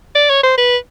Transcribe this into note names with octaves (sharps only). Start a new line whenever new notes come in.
D5
C#5
C5
B4